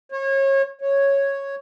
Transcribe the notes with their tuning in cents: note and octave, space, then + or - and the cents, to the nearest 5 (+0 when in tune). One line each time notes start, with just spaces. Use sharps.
C#5 -30
C#5 -5